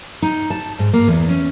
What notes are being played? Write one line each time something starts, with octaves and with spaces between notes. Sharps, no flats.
D#4
A5
G#2
A#3
E2
C#4